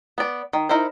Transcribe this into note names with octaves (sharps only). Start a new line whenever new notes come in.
B3 D5
D#3
D#4 E4 A#4 C5